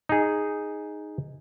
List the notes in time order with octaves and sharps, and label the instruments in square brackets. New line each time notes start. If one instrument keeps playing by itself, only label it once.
[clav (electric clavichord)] D#4 G#4